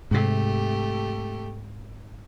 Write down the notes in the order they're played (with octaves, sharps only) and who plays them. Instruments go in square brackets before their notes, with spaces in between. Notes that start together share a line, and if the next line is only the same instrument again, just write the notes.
[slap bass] G#2 C3 [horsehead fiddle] A3 G4